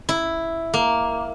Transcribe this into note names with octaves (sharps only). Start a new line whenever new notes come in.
E4
A#3